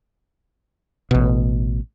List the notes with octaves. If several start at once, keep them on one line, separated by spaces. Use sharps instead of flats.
A1 B2